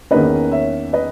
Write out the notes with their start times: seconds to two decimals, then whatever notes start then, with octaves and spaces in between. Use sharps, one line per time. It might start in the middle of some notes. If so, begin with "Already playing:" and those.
0.11 E2 D#3 A#3 C#4 B4 D#5
0.52 C#5 E5
0.93 B4 D#5